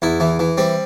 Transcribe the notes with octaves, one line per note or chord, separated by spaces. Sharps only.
E2 E4
E3
E3
G3 C4